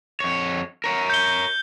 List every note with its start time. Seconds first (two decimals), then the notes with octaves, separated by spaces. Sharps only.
0.20 F2 C#5
0.84 A#4 C#5
1.10 G6 C#7 G7